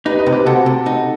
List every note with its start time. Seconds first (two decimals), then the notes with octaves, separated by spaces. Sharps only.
0.05 D#4 G4 B4
0.19 B4 D#5
0.26 C3
0.32 G4 B4
0.46 C3 F#4 A4
0.66 C3
0.86 D#4